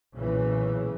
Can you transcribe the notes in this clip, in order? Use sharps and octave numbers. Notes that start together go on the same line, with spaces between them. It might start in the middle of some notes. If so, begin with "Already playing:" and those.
B1 A#2 C#3 E3